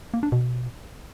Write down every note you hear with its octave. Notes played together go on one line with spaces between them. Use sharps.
A#3
D4
B2